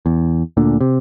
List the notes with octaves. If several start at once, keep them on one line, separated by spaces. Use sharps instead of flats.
E2
D2 A#2 D3
C3